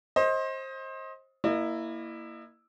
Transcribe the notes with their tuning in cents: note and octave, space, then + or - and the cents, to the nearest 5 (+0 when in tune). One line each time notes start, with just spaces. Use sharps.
C5 +25 D#5 +20
A#3 +0 E4 +0 D#5 -40